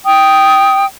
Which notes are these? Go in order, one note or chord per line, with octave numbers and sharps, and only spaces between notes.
G5 D#6